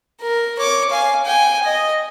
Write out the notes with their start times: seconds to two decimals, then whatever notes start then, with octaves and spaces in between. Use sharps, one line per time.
0.22 A#4
0.59 C#5 D6
0.90 F5 G#5
1.25 G5 G#5
1.63 D#5